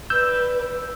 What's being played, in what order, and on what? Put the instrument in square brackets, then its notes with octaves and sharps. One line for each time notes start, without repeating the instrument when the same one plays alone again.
[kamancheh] B4 D5 [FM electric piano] E6 [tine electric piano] G6